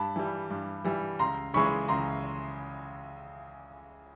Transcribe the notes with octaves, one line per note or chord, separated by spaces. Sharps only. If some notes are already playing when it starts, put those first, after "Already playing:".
Already playing: G2 A5 B5
E3 G3
G2
E3 G3
C#2 A#5 C6
C#3 E3 G#3 B5 C#6
C#2 A#5 C6